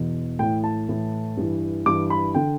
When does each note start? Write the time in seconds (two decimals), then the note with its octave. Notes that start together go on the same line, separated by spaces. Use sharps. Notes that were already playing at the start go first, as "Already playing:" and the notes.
Already playing: E2 B2
0.39 A2 E3 G5
0.64 A5
0.89 A2 E3
1.37 G2 E3
1.86 G2 E3 D6
2.10 B5
2.35 D3 G5